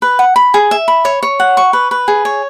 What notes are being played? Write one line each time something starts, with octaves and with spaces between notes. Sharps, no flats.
B4
F#5
B5
G#4
E5
B5
C#5
C#5
F#5
C#6
B4
B4
G#4
C#5